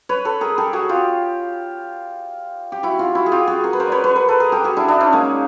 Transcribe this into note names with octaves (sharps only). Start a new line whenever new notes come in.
B4 C#5
A4 B4
G#4 A#4
G4 A4
F#4 G#4
F4 G4
G4
E4 F#4
F4 G4
E4 F#4
G#4
F4 G4
F#4 G#4
G#4 A#4
B4
A#4 C5
B4 C#5 D5
B4 C#5
A#4 C5
A4 B4
G#4 A#4
G4 A4
F#4 G#4
D4 E4
D4 E4
C#4 D#4
G#3 A#3